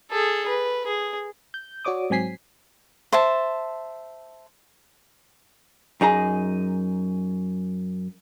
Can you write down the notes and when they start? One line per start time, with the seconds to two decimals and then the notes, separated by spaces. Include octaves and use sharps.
0.12 G#4 A4
0.49 B4
0.87 G#4
1.54 G6
1.85 F#4 C#5 D5 D6 D#6
2.10 G#2 F#3 C4 G#5 B6 C7
3.12 C5 E5 A5
6.01 F#2 D#4 G#4 A#5